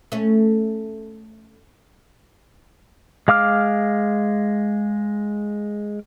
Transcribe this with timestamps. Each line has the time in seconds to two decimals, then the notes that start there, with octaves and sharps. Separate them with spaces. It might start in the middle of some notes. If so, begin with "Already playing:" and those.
0.12 A3 C#4
3.28 G#3 F5 D6 F6